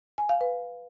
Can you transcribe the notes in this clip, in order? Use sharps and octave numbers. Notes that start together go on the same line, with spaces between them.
G#5
F5
B4